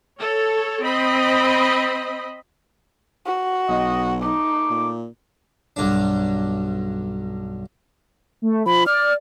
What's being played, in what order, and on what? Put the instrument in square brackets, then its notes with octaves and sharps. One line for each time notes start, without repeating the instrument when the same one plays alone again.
[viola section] A4 C#5
C4 D#5 B5
[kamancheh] F#4
[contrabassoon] B1 [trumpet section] D#5
[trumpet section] A3 D6 [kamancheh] D#4
[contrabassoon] A#2
[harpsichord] B1 G2 D4
[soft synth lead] A3
[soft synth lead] F3 [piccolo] B5
[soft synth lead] D5 [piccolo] F6